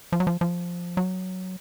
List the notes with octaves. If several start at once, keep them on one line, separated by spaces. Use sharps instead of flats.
F3
F#3
F3
F3
F#3